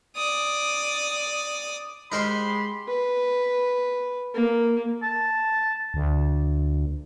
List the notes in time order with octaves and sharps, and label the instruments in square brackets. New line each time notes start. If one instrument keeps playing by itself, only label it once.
[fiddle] D5 D#6
[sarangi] G#3 [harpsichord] D#4 A#4 C5 [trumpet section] G4 B5 C6
[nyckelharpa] B4
A#3
[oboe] A5
[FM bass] D2